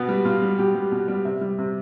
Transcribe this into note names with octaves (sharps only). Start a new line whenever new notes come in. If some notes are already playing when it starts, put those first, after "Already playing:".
Already playing: B2 B3
G3
B2 F4
G3
B2 G4
G3
B2
G3
C3 E5
G3
C3